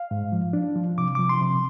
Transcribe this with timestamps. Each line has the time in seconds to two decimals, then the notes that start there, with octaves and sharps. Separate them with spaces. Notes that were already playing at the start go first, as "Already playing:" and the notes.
Already playing: F5
0.11 G#2
0.32 F3
0.53 D4
0.75 F3
0.98 C3 D6
1.15 F3 D6
1.29 C6
1.41 C3